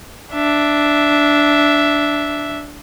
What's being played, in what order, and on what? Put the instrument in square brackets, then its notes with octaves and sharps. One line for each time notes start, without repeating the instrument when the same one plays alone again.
[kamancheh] D4 E5